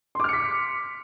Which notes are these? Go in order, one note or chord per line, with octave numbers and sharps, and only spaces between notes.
C6 D6 F6 B6 C#7